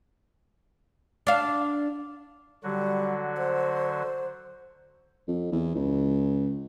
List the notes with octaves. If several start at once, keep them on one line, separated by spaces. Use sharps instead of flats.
D4 F5
D3 F#3 G3 F#4
C5
F2
E2
C#2